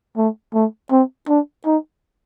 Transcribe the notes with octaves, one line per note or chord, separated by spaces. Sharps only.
A3
A3
C4
D4
D#4